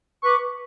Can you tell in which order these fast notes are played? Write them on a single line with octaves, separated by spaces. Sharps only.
C#6 B4 D6